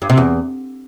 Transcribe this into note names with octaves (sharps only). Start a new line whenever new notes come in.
G2
C3
E2